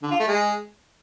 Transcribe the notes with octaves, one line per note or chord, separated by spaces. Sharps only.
D3
F4
A3
G#3